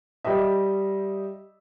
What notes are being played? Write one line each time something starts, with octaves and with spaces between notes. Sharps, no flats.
G3 G4 D#5 E5